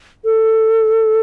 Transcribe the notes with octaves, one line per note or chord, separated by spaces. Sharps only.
A4